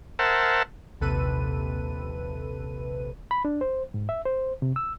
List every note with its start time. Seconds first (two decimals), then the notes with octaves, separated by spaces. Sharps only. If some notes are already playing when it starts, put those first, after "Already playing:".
0.19 A#4 C5 E5 F#5 A5
1.00 A#1 D#2 C3 A4 B4 D#7
3.31 B5
3.45 D4
3.61 C5
3.94 G#2
4.09 E5
4.25 C5
4.62 C3
4.76 E6